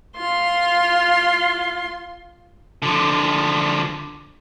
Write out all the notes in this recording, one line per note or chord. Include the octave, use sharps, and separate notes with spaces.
F4 C6
D3 F3